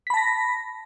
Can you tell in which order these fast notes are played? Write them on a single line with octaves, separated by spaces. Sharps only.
B6 B5 A5 A#6